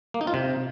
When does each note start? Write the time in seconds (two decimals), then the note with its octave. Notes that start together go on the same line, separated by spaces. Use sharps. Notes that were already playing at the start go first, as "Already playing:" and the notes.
0.14 A#3
0.21 D#4
0.27 F4
0.34 C3